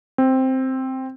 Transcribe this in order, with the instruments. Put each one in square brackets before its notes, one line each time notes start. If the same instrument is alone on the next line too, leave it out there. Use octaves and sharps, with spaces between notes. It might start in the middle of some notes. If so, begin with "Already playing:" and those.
[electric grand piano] C4